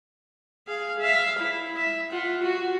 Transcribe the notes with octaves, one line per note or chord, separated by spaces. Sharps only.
G#4 F5
E5 F5
E4
E5
F4 F#5
F#4